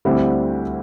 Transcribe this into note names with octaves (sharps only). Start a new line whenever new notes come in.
D2 D3 G3 C4 E4